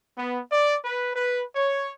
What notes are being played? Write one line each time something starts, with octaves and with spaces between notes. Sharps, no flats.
B3
D5
B4
B4
C#5